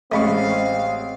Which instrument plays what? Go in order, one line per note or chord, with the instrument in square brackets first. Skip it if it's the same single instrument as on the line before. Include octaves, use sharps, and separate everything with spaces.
[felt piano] A1 G#3 D#5 [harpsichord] A3 B5 C#6 [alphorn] C4 [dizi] F5